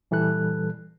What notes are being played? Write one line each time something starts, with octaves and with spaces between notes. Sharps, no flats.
A#2 E3 G3 A4 F#6